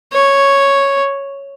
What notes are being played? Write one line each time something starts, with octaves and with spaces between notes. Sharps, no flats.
C#5